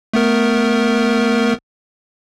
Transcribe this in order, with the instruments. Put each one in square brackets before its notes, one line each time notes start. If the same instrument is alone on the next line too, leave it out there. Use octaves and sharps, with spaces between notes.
[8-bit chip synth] A3 B3 A#4